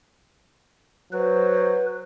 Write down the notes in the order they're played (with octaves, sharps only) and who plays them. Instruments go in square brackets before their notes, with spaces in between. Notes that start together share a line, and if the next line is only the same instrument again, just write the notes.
[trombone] F#3 [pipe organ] B4 [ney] C5